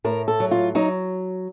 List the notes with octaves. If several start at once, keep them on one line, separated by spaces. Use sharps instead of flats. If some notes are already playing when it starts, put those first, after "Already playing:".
A2 A#4
A4
F#3
F4
F#3 D#4